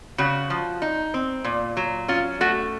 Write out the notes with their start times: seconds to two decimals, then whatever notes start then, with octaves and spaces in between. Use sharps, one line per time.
0.18 C#3 F#4
0.50 F3
0.82 D#4
1.14 C4
1.45 A#2
1.77 F#3
2.08 C#4 F4
2.41 A3 F#4